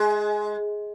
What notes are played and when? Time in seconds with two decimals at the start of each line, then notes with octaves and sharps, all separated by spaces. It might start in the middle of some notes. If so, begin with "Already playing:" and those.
Already playing: G#3